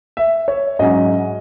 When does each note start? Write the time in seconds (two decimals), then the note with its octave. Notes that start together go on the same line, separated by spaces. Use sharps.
0.17 E5
0.48 C#5
0.79 G#2 F#3 C#4 D#5